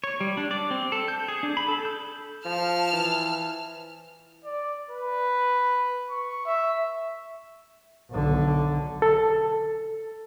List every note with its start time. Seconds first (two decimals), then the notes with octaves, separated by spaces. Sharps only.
0.04 C#5
0.21 G3
0.37 D4
0.51 D5
0.71 C4
0.92 A4
1.08 G6
1.28 G#4
1.43 D4
1.57 B5
1.68 A4
1.85 G6
2.45 F3 A5 F6
2.93 E3
4.45 D5
4.90 B4
6.10 C#6
6.46 E5
8.10 B1 D3
9.02 A4